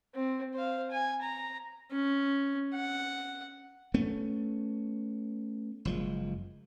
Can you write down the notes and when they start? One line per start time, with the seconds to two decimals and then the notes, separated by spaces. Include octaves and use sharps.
0.15 C4
0.54 C5 F5
0.91 G#5
1.22 A#5
1.91 C#4
2.74 F#5
3.94 A3 B3 C#4
5.85 F#1 F3 G#3